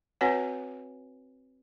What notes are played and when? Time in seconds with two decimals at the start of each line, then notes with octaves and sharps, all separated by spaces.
0.21 C4 F#4 B4 C#5 F#5 G#5